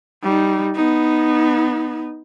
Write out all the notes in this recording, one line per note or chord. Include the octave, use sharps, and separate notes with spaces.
G3 D#4
B3 D#4